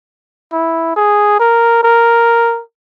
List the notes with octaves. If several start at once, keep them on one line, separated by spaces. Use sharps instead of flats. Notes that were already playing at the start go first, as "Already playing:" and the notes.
E4
G#4
A#4
A#4